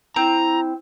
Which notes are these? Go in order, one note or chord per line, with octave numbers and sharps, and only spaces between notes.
C4 E4 A#5